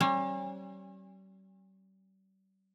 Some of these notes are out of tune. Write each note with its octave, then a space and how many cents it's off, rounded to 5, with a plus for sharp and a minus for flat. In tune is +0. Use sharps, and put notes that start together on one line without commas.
G3 -40 C#4 -40